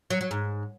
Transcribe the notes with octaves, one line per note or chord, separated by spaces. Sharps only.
F#3
F#3
G#2